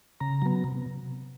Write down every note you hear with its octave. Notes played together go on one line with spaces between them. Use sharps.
C#3 A#5
F#3 B3
C3